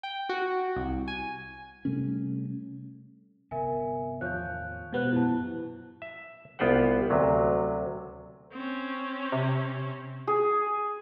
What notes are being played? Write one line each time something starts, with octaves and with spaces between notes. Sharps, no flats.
G5
F#4
C2
G#5
C3 G3 A3 C#4
G1 C3 B3 A#4 E5 G#5
E2 A2 D#3 F3 C#5 F#6 G6
B2 G#3 B3 G4 C5 F#6
F#2 A#2 E3 E4 A5
E5
C2 B3 F4 G4 C5 F#5
D2 C3 F#3
C4 C#4
C3
G#4